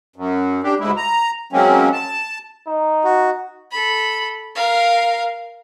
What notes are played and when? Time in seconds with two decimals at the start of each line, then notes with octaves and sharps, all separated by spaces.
0.16 F#2
0.63 D4 G4
0.80 D2 G#2 G#3 A3 E4
0.97 A#5
1.53 F#3 G#3 A#3 C4 C#4
1.92 A5
2.67 D#4
3.04 F#4
3.71 A4 B5
4.55 A#4 F5